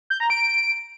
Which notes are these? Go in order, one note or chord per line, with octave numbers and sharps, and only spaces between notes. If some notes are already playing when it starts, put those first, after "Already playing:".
G6
A#5
D7